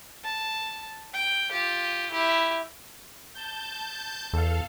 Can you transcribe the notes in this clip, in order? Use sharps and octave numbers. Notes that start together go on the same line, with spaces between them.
A5
G5
F4 G4
E4 G4
A5 G6
E2 A4 F5